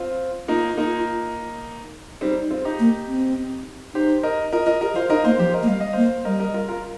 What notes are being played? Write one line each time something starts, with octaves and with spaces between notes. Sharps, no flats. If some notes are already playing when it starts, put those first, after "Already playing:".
Already playing: C4 F4
A#3 D#4 F4
A#3 D#4
G3 C4 D#4
C4 F4
D#4 G4
A#3
C4
D#4 G4 C5
A#4 D#5
F4 A#4 D#5
F4 A#4 D#5
G4 A#4 D#5
F4 C5 F5
D#4 A#4 D#5
A#3 C5 F5
F3 G4 C5
A#4 D#5
A#3
G3 F5
D#5
A#3 C5 F5
G3 A#4 D#5
A#4 D#5
F4 A#4
F4 A#4